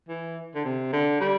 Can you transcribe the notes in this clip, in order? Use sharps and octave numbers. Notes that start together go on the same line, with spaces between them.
E3
D3
C3
D3
G3